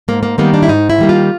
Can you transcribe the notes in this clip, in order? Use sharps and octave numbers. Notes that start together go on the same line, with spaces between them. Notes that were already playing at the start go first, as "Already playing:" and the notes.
G#2 A#3
A#3
D#3 G3 A#3 B3
D4
E4
G#2 D#4
E4
D#3 G3 A#3
F4